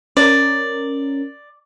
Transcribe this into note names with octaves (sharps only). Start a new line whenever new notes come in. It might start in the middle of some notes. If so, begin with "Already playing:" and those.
C#4 A#4 D5